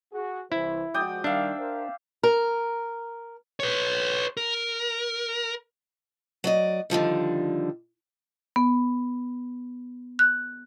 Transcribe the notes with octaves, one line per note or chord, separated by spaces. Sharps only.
F#4 G#4
C2 E3 E4 C5
F3 G#3 F#4 D5 G5 D#6
D#3 G3 D4 E5 F5
A#4 C5
A#4
B4 C#5
A#4
F#3 D5 D#5
D3 D#3 F3 G3
B3
F#6